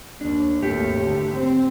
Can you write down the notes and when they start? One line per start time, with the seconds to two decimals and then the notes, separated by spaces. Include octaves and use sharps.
0.21 D#2 D4
0.62 G#1 D#2 A3 G4
1.01 D3
1.34 C4